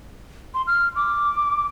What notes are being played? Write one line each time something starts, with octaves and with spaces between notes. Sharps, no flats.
C6
F6
D6